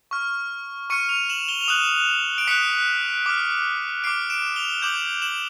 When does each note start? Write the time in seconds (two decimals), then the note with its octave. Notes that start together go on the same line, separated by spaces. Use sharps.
0.11 C#6 F6
0.90 C#6 F6 C#7 D#7
1.09 D#7 F7
1.30 E7 F#7
1.48 F7 G7
1.61 F7
1.68 D#6 F#6 E7 F#7
2.38 D7
2.47 D#6 F#6 B6 C#7
3.26 D6 F6
4.04 D6 F6 C7 D7
4.30 D7 E7
4.56 F7 G7
4.82 D6 G6 E7 F#7
5.22 E7 F#7